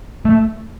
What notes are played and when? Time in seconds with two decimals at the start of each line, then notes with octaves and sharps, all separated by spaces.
0.25 A3